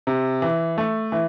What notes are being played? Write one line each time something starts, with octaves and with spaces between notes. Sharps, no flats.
C3
E3
A3
E3